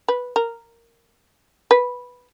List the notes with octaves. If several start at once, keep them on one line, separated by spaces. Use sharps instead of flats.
B4
A#4
B4